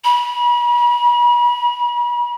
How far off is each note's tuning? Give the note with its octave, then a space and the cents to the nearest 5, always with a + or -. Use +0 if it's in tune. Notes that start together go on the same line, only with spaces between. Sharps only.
B5 -40